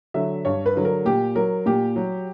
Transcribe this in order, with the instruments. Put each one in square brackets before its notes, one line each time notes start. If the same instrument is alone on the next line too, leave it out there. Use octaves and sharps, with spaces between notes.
[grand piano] D3 F#3 E5
G2 C#5
B4
D3 F#3
A#4
A#2 G4
F#3 A#4
A#2 G4
F#3